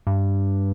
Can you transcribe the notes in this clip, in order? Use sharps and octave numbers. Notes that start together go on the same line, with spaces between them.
G2